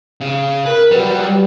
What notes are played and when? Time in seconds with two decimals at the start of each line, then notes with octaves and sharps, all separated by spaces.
0.21 C#3
0.66 A#4 B4
0.91 F#3 G3 B4
1.28 G3